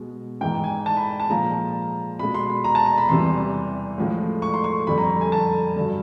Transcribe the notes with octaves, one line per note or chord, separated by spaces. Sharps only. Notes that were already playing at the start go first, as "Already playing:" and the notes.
Already playing: B2 G#3
G#2 E3 G#3 G5
G#5
A5
B5
A5
A#2 F3 G#3 A#5
B2 G#3 B5
C6
B5
A#5
A5
A#5
B5
E2 C3 E3 G3 C6
A2 F3 G#3
C#6
C6
C#6
F2 D3 G3 B5
A#5
G#5
A5
G2 D3 F#3